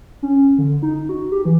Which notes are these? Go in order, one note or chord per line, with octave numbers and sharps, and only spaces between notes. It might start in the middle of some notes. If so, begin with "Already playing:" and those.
C#4
D3
D#4
F#4
G4
E3